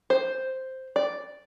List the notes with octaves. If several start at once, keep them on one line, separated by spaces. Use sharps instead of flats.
C5
D5